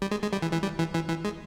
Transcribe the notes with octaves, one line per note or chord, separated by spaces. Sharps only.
G3
G#3
G#3
G3
E3
E3
G3
E3
E3
E3
G#3